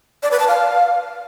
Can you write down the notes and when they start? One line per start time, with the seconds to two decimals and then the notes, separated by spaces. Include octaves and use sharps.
0.23 D5
0.31 B4
0.39 A5
0.48 F5